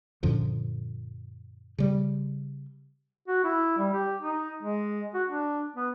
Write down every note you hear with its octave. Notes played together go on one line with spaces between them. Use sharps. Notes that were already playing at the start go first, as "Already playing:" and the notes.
F#2 A#2 D3 F3
C#3 G3
F#4
E4
G3
G4
D#4
G#3
F#4
D4
B3